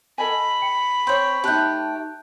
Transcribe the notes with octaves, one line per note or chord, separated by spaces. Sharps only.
A4 D#5 G#5 B5
G5 C#7
C4 C#5 C6 G6
A3 C#4 D#4 G4 A5 F#6 G6